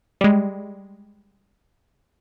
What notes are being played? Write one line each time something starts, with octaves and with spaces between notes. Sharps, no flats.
G3 G#3